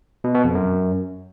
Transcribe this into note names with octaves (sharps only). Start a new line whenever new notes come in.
B2
B2
F2
F#2